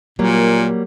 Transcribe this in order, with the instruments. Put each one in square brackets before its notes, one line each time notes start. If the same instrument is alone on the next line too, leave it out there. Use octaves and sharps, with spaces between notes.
[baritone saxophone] A#2 [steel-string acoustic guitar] F#3 G3 A#3